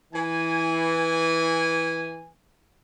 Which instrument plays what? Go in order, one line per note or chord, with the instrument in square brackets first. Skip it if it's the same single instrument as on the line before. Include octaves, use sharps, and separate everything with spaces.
[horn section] E3 G#5